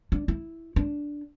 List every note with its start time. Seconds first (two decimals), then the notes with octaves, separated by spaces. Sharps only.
0.12 D4
0.28 E4
0.76 D4